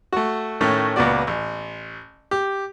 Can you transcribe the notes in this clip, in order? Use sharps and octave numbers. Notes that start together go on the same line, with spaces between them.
A3 F#4
A2 D#3 A3 C#4
C#2 A#2 B3 F#4 D5
A1
G4